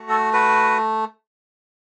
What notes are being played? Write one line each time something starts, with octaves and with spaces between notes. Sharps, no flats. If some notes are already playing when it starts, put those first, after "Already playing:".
Already playing: A3 F#4
A4
F#4 B4